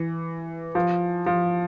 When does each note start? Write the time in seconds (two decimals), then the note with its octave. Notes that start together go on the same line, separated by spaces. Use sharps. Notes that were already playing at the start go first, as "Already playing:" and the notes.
Already playing: E3
0.75 F3
1.26 F3